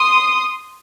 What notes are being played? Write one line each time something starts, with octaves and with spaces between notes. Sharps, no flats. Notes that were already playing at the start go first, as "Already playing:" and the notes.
Already playing: C6 D#6